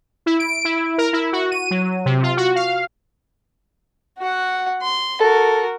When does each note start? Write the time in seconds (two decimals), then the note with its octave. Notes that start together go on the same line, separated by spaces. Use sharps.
0.26 E4
0.40 D7
0.65 E4
0.98 A#4
1.13 E4
1.33 F#4
1.51 D#7
1.71 F#3
2.05 C3
2.23 F4
2.37 F#4
2.56 F5
4.18 F#4 F#5
4.82 C6
5.21 F#4 A4 A#4